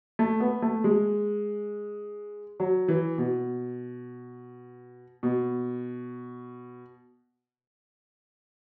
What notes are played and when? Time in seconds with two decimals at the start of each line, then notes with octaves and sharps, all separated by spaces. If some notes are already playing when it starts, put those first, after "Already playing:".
0.19 A3
0.40 B3
0.62 A3
0.84 G#3
2.60 F#3
2.88 E3
3.18 B2
5.23 B2